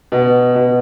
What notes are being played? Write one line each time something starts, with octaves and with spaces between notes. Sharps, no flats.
B2
B2